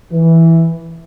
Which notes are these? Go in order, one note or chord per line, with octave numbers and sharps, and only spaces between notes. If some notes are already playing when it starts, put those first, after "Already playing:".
E3